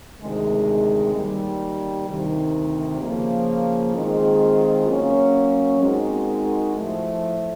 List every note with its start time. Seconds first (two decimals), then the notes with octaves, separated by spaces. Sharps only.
0.20 D2 C3 D#3 G#3
1.14 D#2 D#3 G3
2.07 D2 C3 D#3
3.01 C#3 F3 A#3
3.94 D#3 G#3 C4 F4 G#4
4.87 F#3 A#3 C#4
5.81 G#3 C4 D#4 F#4 A#4
6.74 A2 F3 A3